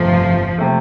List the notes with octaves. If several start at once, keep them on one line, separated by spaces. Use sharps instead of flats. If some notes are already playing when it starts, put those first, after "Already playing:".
Already playing: G1 F2 C3 F3 A3 C4
C3 A3